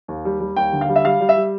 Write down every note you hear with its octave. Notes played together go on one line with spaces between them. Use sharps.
D#2
G3
G3
D#2 G5
D3
F5
G3
E5
G3 F5
G3
E5
G3